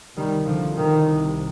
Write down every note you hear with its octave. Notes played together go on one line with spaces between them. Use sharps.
C2 C3 D#3 G3
D3 F3
D#3